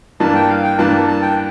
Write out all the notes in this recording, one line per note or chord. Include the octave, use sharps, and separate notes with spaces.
G2 E3 A#3 D4 A5
G5
F5
G5
G2 E3 A#3 D4 A5
A5
G5